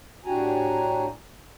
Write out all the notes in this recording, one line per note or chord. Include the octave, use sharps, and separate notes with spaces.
A2 D4 F#4 G4 G#5 A#5